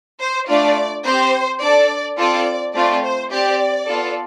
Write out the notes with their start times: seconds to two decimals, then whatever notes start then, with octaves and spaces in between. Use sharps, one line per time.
0.20 C5
0.48 A3 D4 F4 D5
1.04 C4 G4 C5
1.61 D4 A4 D5
2.17 C4 F4 A4 D5
2.74 A3 C4 F4 D5
3.03 C5
3.31 C4 G4 D5
3.87 B3 F4 A4